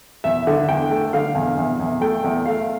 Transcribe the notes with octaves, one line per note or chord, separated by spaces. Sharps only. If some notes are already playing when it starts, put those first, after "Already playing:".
E2 E5
D3
E2 G5
A3
D3 F5
E2
E2
E2
A3 G5
E2
A3 F5